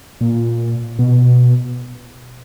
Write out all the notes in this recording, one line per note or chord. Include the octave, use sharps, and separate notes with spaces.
A#2
B2